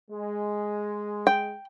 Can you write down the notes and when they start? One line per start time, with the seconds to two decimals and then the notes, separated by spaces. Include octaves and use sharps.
0.11 G#3
1.27 G5